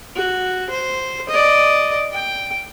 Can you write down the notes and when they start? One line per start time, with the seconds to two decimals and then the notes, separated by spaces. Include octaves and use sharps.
0.16 F#4
0.70 C5
1.29 D5 D#5
2.11 G5